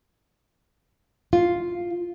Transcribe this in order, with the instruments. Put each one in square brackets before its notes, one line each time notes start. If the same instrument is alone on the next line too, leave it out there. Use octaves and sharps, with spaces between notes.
[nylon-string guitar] F4